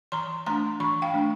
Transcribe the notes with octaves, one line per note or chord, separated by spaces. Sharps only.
E3 A#5 C6
A3 D4 A#5 C6
E3 B5 C#6
F5 G5
A3 D4